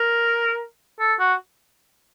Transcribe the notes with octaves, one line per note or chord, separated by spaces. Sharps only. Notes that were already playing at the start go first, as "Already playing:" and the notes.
Already playing: A#4
A4
F#4